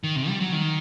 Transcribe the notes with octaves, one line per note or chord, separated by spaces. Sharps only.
D#3
C3
G3
F#3
D#3